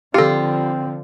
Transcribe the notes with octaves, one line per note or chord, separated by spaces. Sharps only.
D3 F3 G3 C4 F4 G4 A4